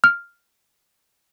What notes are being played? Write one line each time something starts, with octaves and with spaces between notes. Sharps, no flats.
F6